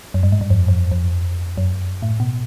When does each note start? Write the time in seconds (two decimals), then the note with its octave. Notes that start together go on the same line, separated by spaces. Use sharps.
0.14 F#2
0.23 G2
0.32 G#2
0.41 G2
0.50 F2
0.68 F2
0.92 F2
1.58 F#2
2.02 A2
2.20 B2